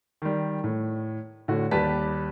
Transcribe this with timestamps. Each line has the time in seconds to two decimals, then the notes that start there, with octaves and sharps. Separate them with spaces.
0.22 D#3 G3
0.64 A2
1.48 A2 D3 F#4
1.71 D#2 G3 G4 B4 A5 B6